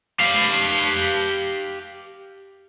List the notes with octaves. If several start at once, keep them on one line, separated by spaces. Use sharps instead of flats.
G4 F5